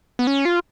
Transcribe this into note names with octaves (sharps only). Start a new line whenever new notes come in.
B3
C#4
F4